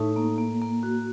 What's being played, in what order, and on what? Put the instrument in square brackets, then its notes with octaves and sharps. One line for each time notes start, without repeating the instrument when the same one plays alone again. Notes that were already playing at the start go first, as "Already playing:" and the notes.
Already playing: [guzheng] A2 [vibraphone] D#4
[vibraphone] A#3
A#3
A#3
F#4